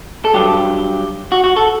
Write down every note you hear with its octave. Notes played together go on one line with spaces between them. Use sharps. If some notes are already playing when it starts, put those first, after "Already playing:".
A4
G2 F#3 G4
F#4
F#4
A4